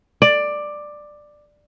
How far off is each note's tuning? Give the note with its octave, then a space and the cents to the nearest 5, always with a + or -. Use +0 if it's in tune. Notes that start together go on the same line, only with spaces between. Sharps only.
D5 +10